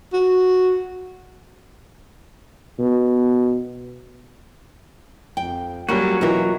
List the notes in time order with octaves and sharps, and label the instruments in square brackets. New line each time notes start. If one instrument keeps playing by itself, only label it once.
[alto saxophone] F#4
[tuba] B2
[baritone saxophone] F2 [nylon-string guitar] G5
[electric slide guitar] F#3 C#4 F#4 [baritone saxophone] G3 [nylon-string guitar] A#3 F4
[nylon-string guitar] B2 A#4 E5 [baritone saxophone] E3 [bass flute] F4